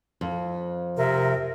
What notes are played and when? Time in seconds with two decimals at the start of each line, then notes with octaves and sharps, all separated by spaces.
0.21 F2
0.97 C3 A#4 E5